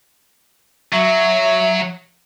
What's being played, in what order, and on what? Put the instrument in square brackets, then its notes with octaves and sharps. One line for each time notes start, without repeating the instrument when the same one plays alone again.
[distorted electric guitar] F#3 [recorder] E5